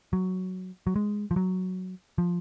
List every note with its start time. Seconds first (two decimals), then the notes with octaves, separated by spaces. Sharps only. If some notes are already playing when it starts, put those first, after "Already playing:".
0.13 F#3
0.87 F#3
0.96 G#3
1.31 F3
1.36 F#3
2.18 F3